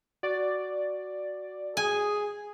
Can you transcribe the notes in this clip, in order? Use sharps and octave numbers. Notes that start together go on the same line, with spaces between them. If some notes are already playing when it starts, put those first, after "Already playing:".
F#4 D5
G#4 G#5